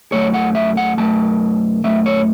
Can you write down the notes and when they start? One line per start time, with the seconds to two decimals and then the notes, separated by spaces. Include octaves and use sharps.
0.12 F#2 F#3 A3 C#5
0.34 F#5
0.55 E5
0.77 F#5
0.97 F#2 F#3 A3 A5
1.84 F#2 F#3 A3 E5
2.06 C#5